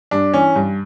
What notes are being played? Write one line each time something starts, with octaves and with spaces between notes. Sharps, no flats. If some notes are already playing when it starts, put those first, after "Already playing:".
G2 D4
E3 C#4
G2